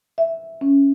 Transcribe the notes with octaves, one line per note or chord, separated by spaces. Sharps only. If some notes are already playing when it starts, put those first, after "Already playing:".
E5
C#4